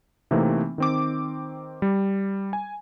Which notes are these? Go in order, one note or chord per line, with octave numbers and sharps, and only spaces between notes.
C3 E3 A3 A#3 C4 D#4
D#3 C4 D6
G3
G#5